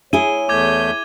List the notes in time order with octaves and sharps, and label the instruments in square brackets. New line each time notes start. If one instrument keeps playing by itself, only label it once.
[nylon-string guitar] E4 G#4 [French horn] C#5 [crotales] D#7 G7
[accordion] E2 A3 G6 [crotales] D6 G#6